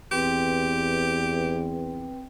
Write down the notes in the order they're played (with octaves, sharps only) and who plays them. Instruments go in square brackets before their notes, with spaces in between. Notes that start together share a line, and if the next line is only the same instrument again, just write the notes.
[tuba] E2 [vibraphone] C4 B4 G5 [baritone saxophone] G4